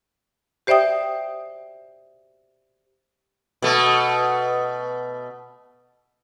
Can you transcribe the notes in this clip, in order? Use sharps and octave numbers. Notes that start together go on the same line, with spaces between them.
G4 C5 D5 E5 G5 D#6
B2 A3